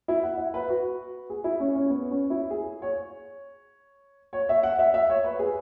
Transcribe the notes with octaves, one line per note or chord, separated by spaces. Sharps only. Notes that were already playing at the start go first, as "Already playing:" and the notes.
E4
F#5
E5
B4
F#4
G#4
E4
C#4
C#4
B3
C#4
E4
G#4
C#5
C#5
E5
F#5
E5
E5
C#5
B4
G#4